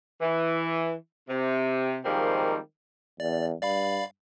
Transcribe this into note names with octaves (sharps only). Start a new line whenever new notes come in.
E3
C3
D#3 F3 G3 G#3 A#3 C4
E2 D5
G2 D5 F5 B5